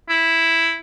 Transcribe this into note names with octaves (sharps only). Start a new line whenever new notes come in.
E4